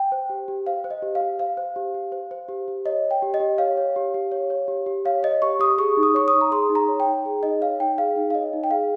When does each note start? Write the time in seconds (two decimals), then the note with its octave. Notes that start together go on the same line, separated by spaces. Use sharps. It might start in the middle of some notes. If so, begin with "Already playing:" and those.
Already playing: G5
0.12 C5
0.30 G4
0.48 G4
0.66 C5 F5
0.84 C5
0.91 D#5
1.02 G4
1.15 F5
1.21 G4
1.39 C5 F5
1.57 C5
1.76 G4
1.94 G4
2.12 C5
2.31 C5
2.48 G4
2.68 G4
2.85 C#5 D#5
3.05 C#5
3.11 G5
3.22 G4
3.34 D#5
3.40 G4
3.58 C#5 F5
3.77 C#5
3.96 G4
4.14 G4
4.32 C#5
4.50 C#5
4.68 G4
4.86 G4
5.05 C#5 F5
5.23 C#5 D#5
5.42 G4 C#6
5.59 G4 D#6
5.78 G#4 C#6
5.97 D#4
6.03 D#6
6.14 C#5 C#6
6.28 D#6
6.33 D#4
6.41 A#5
6.51 G#4 C6
6.70 D#4
6.75 A#5
6.88 C#5
7.00 G5
7.06 D#4
7.25 G#4
7.43 D#4 D#5
7.61 C#5 F5
7.80 D#4 G5
7.98 G#4 F5
8.16 D#4
8.30 F5
8.34 C#5 D#5
8.53 D#4
8.64 G5
8.71 G#4 F5